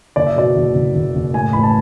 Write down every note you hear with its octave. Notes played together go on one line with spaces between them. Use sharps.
F#1 D5
E5
B2 D5
F#1
F#1
F#1
F#1
A2 G#5
A1 B5
A5